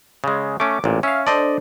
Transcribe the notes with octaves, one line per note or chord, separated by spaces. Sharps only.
C#3 G#3
A3 C#4 D6
A1 A#2
C#4 E5 F5
D4 A4 C5 D5 D#5